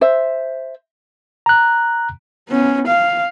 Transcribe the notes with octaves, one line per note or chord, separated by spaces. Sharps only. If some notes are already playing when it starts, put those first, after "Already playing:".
C5 E5
A#5 F#6
B3 C#4
F5